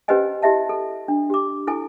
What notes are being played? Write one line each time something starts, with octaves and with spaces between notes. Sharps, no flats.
C#4 G4 B4 C5 D#5 G#5
E4 G4 D#5 E5 A5
A4
D4
G4 D6
E4 A4 G#5